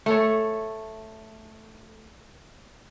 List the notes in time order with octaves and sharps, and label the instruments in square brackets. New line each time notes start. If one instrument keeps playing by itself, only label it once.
[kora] A3 A4 C#5